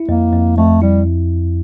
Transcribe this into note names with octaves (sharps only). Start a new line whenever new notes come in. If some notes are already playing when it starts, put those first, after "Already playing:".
Already playing: E4
F2 A#3
F2
F2 A3
G3 E4